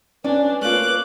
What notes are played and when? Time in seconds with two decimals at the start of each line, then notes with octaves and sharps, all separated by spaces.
0.24 C#4 D4 B4 D5 G#5
0.61 A3 A#3 C#4 F4 D6 F#6